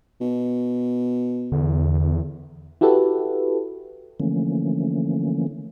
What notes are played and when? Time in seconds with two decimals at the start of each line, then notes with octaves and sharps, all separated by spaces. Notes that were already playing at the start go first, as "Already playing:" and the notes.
0.21 B2
1.52 E2 D3
2.81 E4 F#4 G4 A4 B4
4.20 D3 E3 F3 A3 A#3 C#4